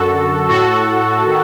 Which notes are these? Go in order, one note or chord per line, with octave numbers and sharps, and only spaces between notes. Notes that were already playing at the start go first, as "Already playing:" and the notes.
Already playing: F#2 D3 F#4 A4
A2 F#4 A4
D#3